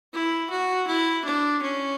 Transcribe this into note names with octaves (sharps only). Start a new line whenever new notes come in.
E4
F#4
E4
D4
C#4